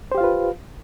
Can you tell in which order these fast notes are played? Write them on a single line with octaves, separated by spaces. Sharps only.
C5 G4 F5 F4 B4